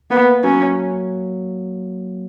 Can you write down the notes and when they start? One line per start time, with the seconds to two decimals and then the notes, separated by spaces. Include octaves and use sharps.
0.10 A#3 B3
0.44 F#3 C#4